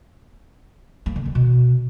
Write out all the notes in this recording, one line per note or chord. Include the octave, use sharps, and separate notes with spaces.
A#3
D3
D#3
B2